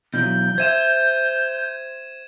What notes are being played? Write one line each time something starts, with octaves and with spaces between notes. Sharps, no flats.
B2 E3 F#3 G6
C5 E5 G#6 D#7 E7